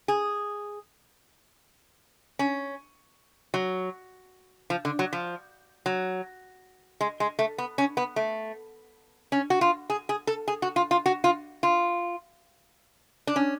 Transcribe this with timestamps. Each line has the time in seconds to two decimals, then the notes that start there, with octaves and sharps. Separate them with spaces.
0.08 G#4
2.39 C#4
3.54 F#3
4.70 F3
4.85 D3
4.99 F#3
5.13 F3
5.86 F#3
7.01 G#3
7.20 G#3
7.39 A3
7.58 B3
7.78 C#4
7.97 B3
8.16 A3
9.32 C#4
9.50 F#4
9.61 F4
9.90 G#4
10.09 G#4
10.27 A4
10.48 G#4
10.62 F#4
10.76 F4
10.91 F4
11.06 F#4
11.24 F4
11.63 F4
13.27 D4
13.36 C#4